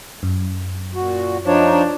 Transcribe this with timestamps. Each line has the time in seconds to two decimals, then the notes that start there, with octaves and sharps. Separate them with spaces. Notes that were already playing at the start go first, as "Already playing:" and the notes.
0.23 F#2
0.95 A#2 F#4
1.46 F3 D4 D#4 C#5